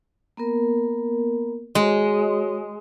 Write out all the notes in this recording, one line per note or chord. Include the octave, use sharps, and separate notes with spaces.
A#3 B3 A#4
G#3 F#4 C#5